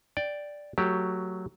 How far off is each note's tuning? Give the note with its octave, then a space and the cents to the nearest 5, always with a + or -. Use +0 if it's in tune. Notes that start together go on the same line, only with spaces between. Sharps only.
D5 +0 G5 +0
F#3 +0 A3 +30 G4 +0